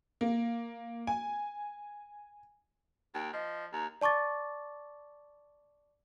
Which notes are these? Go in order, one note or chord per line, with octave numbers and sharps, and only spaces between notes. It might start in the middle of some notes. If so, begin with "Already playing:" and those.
A#3
G#5
D#2 G5
F3 D#5
D#2 A#5
D5 A5 C#6 D6 A6